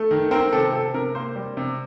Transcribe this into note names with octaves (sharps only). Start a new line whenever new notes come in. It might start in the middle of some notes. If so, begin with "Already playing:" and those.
Already playing: A3
D#3
C4 A#4
C3 A4
C3 A4
C3 A#4
A#3 C5
G3
C3